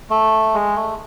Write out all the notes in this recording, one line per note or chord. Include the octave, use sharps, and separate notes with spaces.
A3
G#3
A3